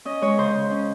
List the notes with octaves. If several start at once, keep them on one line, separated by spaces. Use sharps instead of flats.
C#4 D#5
G#3 C#5
C#3 C5
C#3
C#4